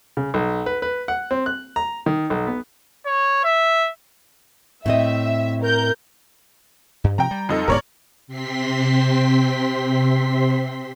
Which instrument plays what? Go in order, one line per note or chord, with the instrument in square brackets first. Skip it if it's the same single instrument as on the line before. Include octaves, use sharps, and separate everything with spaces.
[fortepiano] C#3
B1
B4
B4
F#5
C4
F#6
A#5
D#3
B1
B3
[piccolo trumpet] C#5
E5
[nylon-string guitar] A2 C4 D#5 [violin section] E5
[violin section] A#4 G6
[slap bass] G2
[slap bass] C3 F3 C4 [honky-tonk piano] G5 A#5
[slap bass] G3
[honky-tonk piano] F2 D#4 A4
[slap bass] D1 G#2 B3 [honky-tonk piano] A#4 C#5 D5
[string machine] C3 C4 C6 B6